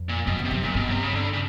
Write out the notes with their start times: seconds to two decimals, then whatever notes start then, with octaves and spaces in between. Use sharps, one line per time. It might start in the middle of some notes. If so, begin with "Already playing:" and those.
Already playing: F2
0.09 A#2
0.27 F#2 B2
0.39 F2
0.45 C3
0.51 F#2
0.63 F#2 A#2
0.75 G2 B2
0.87 G2 C3
1.03 C#3
1.15 D3
1.33 C#3